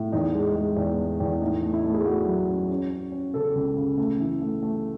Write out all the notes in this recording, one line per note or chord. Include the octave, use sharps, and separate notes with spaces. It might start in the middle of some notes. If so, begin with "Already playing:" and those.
Already playing: A2
E2 D#4
G#3
G#3
E2
G#3
E2
A2 D#4
A3
E4
A3
G#4
A3 F#4
F#3
C#4
C#4
C#4
C#4
C#3 A4
C#2
C#3
A3
E3
A3
A3